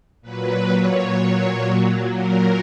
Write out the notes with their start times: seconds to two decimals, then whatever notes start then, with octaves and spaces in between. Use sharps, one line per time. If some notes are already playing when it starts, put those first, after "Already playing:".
0.22 A#2 F#3 B4
0.69 C#5
1.16 A#2 F#3
2.09 A#2 F#3 A#4